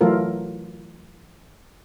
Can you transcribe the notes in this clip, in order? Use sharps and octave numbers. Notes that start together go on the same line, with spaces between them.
E3 F#3 A3 F4 A4 A#4